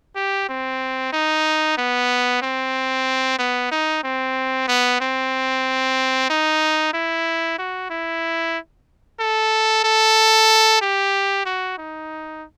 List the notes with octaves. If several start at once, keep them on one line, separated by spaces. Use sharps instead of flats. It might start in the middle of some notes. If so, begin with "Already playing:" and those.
G4
C4
D#4
B3
C4
B3
D#4
C4
B3
C4
D#4
E4
F#4
E4
A4
A4
G4
F#4
D#4